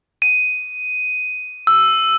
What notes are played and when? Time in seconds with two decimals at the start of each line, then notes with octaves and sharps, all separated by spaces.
0.22 D#7
1.67 E6